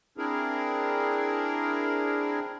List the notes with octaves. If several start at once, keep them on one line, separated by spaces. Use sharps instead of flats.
C4 D4 E4 G#4 A#4